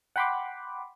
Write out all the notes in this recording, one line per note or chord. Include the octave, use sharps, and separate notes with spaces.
F#5 G5 B5 C6 D6